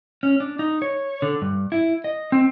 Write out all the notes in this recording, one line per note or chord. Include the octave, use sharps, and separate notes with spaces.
C#4
D4
D#4
C#5
D3
G2
E4
D#5
C4